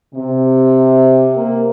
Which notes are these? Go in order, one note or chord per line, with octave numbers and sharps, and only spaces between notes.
C3
A#3